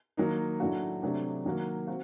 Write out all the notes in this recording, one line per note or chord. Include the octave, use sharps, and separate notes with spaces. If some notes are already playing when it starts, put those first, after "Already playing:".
D#3 F#3 A#3 D#4
A2 F#3 A3 D4 F#4
C3 F#3 A3 D4
D#3 F#3 A#3 F#4
C4 F#4